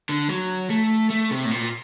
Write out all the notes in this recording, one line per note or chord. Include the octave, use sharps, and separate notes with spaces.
D3
F#3
A3
A3
C3
A2
A#2